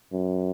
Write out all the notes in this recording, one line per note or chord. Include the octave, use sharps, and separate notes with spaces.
F#2